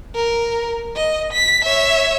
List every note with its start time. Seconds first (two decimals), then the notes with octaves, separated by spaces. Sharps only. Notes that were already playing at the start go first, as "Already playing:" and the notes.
0.15 A#4
0.96 D#5
1.33 B6
1.65 C#5 E5